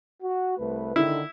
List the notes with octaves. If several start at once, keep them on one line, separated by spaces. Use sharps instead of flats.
F#4
C2 A3 B4
D3 D#3 E4